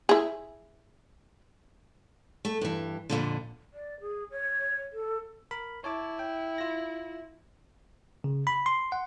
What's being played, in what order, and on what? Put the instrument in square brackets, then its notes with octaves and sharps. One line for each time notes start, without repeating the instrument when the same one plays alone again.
[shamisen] E4 G#4
[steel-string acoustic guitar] A3
G2 E3
F2 A#2 D3
[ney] D5
G#4
C#5
A4
[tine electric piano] A#4 B5
[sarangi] E4 [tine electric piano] C#5 A5 D6
[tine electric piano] G5
F4 A#6
C#3
B5
C6
F#5